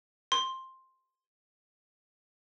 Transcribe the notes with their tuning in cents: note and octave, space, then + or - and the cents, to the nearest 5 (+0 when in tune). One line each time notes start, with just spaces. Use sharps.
C6 +5